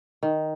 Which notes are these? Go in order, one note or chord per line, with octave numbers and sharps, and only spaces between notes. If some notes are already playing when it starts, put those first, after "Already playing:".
D#3